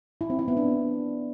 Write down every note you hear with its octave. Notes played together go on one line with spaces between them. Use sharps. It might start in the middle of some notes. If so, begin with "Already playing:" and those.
E4
C4
E4
B3
D4